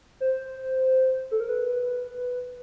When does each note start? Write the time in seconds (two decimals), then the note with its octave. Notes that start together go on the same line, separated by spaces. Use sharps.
0.20 C5
1.31 A4
1.40 A#4
1.49 B4